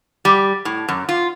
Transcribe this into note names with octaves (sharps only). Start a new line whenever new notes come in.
G3
A2
F#2
F4